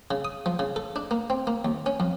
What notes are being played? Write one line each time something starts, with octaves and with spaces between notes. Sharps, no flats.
C#3
D#6
F3
C#3
A4
D4
A#3
C4
A#3
D#2
C#4
F2